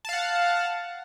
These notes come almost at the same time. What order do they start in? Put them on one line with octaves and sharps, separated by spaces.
A5 F5 F#5